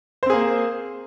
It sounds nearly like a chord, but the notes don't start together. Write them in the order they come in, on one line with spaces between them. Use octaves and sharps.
C5 C4 G#4 A#3